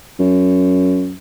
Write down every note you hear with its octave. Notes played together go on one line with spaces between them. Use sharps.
F#2